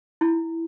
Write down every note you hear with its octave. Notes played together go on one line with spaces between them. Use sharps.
E4